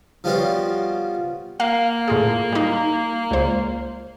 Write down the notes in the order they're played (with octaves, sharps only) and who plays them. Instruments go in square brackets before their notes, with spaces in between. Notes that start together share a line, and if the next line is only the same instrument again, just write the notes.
[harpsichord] F3 G3 B3 C#4 F4 F#4
[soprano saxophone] A#3 [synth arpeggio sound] F5
[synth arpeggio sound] A2 F4 G#4
G3 D#4
C#2 C5